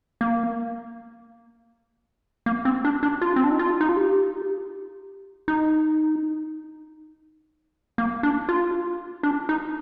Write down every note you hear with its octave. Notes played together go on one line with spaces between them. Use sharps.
A#3
A#3
C4
D4
D4
F4
C4
D4
D#4
F4
D#4
F4
G4
D#4
A#3
D4
F4
D4
D#4